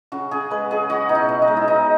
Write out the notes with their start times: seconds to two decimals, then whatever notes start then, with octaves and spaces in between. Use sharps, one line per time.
0.12 C#3 F#4
0.31 C#3 G#4
0.50 G#3 B4
0.71 C#3 G#4
0.89 G#3 F#4
1.09 B2 D#4
1.15 E4
1.29 B2
1.42 D#4
1.48 G#3
1.57 E4
1.68 B2 D#4